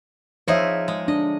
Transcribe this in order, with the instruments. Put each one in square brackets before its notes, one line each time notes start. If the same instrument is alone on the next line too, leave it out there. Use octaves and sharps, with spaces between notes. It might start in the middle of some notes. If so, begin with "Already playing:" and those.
[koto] F3 D#4 G#4 [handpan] C5 C#5 E5
[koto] G#3
[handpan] D4 [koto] D#5